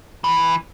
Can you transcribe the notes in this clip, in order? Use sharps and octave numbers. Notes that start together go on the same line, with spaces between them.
E3